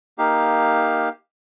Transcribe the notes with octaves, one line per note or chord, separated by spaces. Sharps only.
A#3 D#4 G4 F5